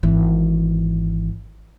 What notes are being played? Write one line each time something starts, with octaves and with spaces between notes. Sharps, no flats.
G#1 E3